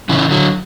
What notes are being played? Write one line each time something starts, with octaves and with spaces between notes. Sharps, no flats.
C#3 E3
D3 F#3